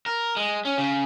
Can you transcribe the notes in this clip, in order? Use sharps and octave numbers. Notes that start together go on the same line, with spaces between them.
A#4
G#3
C#4
C#3